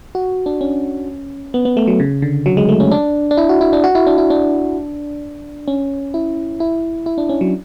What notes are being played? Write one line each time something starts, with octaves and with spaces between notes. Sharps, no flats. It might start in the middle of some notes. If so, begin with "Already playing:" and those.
F#4
D4
C#4
B3
B3
A3
F#3
C#3
D3
F#3
G#3
A3
C#4
D4
D4
E4
F#4
E4
D4
F#4
E4
D4
E4
D4
C#4
E4
E4
E4
D4
C#4
F#3